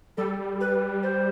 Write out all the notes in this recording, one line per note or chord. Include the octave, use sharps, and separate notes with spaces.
G3 A4
B4
C5